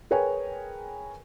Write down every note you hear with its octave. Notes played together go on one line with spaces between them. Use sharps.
G#4 A#4 B4 C#5 G5 G#5